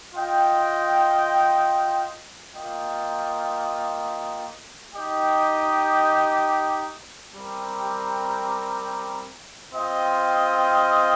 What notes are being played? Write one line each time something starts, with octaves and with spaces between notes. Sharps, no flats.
F4 D#5 G5
A#3 F4 D#5 G5
D#4 G4 D#5 G5
G3 C4 G4 A#4
C4 F4 D#5 G5